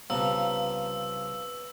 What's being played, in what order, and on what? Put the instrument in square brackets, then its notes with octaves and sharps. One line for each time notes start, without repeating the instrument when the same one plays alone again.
[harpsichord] C2 C#3 F3 [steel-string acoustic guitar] B3 A#5 [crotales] E6